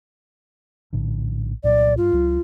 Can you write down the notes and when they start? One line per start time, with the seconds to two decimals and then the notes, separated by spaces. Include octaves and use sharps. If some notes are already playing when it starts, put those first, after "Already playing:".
0.93 A#1 A2 D3
1.64 C2 A#2 F#3 D5
1.97 G2 F4
2.13 C#2 F#3